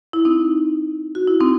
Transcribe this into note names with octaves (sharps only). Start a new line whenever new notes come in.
E4
C4 D#4
F#4
E4
C4 D#4